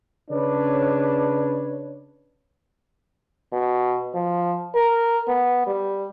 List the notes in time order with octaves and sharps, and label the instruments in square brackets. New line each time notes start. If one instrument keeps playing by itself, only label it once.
[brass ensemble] C#3 D4 B4 C#5
[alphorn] B2
F3
A#4
B3
G3